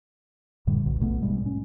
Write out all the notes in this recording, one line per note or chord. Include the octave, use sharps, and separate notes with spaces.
F2 A2 D3 G3
E1 B1
A#1 B2 A3 B3
G#2 G3 G#3
C#4